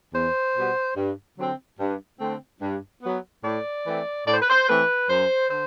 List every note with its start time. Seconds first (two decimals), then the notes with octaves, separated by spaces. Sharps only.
0.14 E2 C5
0.55 B2 G3 B3
0.96 G2
1.37 D3 F#3 C4
1.79 G2
2.20 D3 A3 C4
2.61 G2
3.03 F#3 B3
3.44 A2 D5
3.85 E3 A3 C4
4.26 A2 D5
4.34 C5
4.42 B4
4.50 C5
4.68 E3 A3 C4 B4
5.09 F#2 C5
5.50 D3 C5